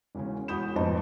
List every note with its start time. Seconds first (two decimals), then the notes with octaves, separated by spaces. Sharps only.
0.15 E1 C#3 C#4
0.48 E1 F#4 B5 D#6 G6 E7
0.76 F1 F2 G#2 B3 D#5 A5